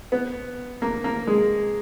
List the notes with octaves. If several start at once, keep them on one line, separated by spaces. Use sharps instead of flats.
B3
A#3
A#3
G#3